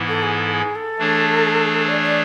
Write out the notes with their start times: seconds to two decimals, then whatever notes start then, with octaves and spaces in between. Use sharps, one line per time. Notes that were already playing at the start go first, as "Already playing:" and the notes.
Already playing: G#2 E3 B3 E4
0.08 A4
0.23 G#4
0.38 A4
0.53 G#4
0.76 A4
0.98 E3 A3 D4 G#4 C#5
1.88 D5
2.03 D5